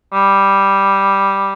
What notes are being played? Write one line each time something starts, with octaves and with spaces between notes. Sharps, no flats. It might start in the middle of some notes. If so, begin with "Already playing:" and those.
G3